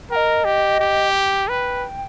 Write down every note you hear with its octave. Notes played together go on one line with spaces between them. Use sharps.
A#4 G5
D#5
G4
G4
B4 G5